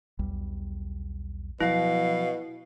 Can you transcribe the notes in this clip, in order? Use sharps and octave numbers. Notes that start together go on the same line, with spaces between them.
B1 E2 G3
B2 F3 F#3 E4 F5